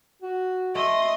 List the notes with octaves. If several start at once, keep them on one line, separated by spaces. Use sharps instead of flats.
F#4
A3 D#5 C6